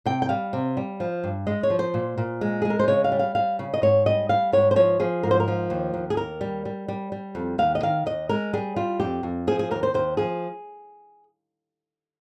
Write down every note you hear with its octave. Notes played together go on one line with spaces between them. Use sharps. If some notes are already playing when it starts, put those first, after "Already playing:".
C3 G5
G5
G3 F5
C3
G3
F3
G2
G#3 D#5
C#5
F3
C5
A#2
A#2
G#3
G#3 G#4
A#4
C5
C#3 C#5
F5
G3
F5
G3 F5
C#3
D#5
G#2 C#5
G3 D#5
G3 F5
G#2 C#5
C5
F3 C#5
F3 G#4
G#2 A#4
C5
A#4
F3
D#2
D#2
G#4
D#2 A#4
G3
G3
G3
G3
F2
D#2 F5
D#5
D#3 F5
D#2 D#5
G#3 A#4
G3 G#4
G3 F4
F2 G4
F2
F3 G#4
G#4
D#2 A#4
C5
D#2 C5
F3 G#4